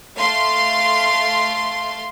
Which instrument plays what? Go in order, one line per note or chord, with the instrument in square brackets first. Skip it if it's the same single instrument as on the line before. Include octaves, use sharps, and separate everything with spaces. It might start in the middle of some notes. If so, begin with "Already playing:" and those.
[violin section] A3 F5 C6